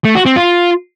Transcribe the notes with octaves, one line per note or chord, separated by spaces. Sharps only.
A3
F#4
C4
F4